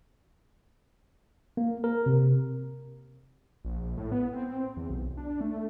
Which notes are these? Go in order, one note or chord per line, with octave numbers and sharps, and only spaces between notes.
A#3
A#4
C3
A#1
A2
B3
C4
E2
B1
D4
A3